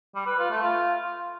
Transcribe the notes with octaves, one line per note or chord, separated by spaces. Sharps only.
G3
B4
F4
A3
F4